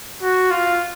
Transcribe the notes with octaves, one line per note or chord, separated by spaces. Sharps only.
F#4
F4